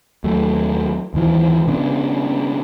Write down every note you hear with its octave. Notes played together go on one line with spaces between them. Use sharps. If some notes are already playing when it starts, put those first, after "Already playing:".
D#2 F#3 A3
D#2 G#2 E3 F3
C#3 G#3 B3 D4